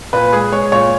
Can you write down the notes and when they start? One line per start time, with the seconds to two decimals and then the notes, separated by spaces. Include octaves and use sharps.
0.13 A#2 B4
0.33 G#3 G#4
0.52 G#3 C#5
0.72 A#2 C#5